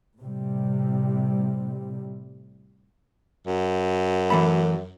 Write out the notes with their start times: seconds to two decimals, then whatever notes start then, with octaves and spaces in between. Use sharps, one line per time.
0.19 A2 C3 G3
3.47 F#2
4.30 E3 A3 B5